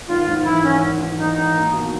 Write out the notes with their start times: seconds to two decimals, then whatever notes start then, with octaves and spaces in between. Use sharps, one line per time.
0.09 G#1 F4
0.27 G#2
0.45 E3 E4
0.64 G#1 C#4
0.82 G#1
1.01 G#2
1.19 E3 D#4
1.37 G#1
1.55 A#3
1.73 B2